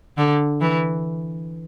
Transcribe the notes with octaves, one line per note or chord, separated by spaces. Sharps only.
D3
E3